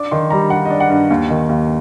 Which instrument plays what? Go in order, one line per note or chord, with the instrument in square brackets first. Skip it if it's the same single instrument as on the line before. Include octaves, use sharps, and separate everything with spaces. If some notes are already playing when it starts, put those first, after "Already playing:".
Already playing: [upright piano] D4 D6
D#3 C6
G3 A#5
G3 F#5
D#5
D4
F#5
G2
D#2
D#3
D#2